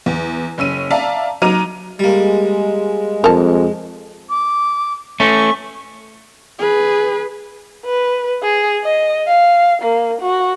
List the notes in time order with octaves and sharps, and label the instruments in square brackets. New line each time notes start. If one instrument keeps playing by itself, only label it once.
[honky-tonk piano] E2
F#1 C#4 E6 D#7
D5 E5 F5 A5 A#5
F#3 D#4 A#5 D6 F6 D#7
[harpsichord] G3 A#3 [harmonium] G#3
[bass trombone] F2 [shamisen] A#4 A5
[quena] D6
[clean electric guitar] A3 C#4 [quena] C#6
[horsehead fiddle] G#4 B4
[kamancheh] B4
G#4
D#5
F5
A#3
F#4